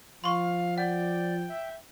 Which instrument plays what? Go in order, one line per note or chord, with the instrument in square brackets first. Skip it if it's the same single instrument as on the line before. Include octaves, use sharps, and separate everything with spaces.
[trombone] F3 [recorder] F5 [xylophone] C6 C#6
[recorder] D5 [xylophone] F#5 [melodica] G5
[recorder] E5